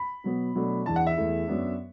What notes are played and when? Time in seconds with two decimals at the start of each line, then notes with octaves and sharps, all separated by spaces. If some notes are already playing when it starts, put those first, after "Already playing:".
Already playing: B5
0.24 B2 F#3 B3
0.55 B2 F#3 A3 D4
0.85 E2 E3 D4 A5
0.96 F#5
1.07 E5
1.17 E2 E3 A3 E4
1.48 F#2 F#3 B3 D4